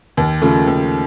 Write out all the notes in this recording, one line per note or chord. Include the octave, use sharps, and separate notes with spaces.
D#2
C#3 F3 A3
D#2